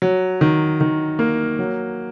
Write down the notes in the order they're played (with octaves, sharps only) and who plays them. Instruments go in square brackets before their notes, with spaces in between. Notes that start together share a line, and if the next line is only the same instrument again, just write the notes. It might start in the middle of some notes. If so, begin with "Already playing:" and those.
[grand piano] F#3
D#3
D#3
A#3
F#3